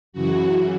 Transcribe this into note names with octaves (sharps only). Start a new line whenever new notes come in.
F#2 C#3 E3 F#4